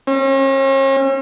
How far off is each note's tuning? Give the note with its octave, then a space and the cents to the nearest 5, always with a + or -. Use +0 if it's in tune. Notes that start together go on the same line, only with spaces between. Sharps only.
C#4 -45